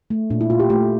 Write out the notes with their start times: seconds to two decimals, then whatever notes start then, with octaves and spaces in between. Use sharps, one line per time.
0.10 A3
0.30 A#2 D4
0.41 E4
0.50 A#2 F4
0.60 G4
0.70 A3 G4